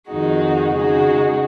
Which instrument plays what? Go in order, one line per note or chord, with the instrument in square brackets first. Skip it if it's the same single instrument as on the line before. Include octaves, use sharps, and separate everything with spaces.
[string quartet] F2 D#3 G#3 D#4 F#4
C#3 G#3 D#4 F#4